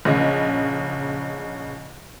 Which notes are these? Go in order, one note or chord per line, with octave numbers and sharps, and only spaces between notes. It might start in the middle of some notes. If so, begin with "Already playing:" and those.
A#1 C#3 D#5